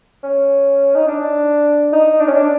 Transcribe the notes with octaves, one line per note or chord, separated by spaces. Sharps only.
C#4
D#4
D4
D#4
D4
C#4
D4